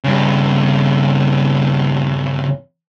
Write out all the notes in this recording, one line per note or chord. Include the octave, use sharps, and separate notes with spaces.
G2 C#3